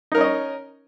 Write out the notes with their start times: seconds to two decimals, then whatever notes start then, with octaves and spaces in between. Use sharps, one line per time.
0.12 D#4
0.15 A#4
0.18 C#4
0.21 D#5
0.24 C#5